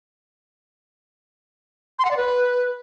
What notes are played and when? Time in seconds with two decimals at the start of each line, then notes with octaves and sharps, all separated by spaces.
1.99 C6
2.05 F#5
2.11 D5
2.17 B4